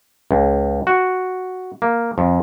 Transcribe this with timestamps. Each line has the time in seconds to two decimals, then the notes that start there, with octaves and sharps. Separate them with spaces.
0.31 C#2
0.87 F#4
1.82 A#3
2.18 F2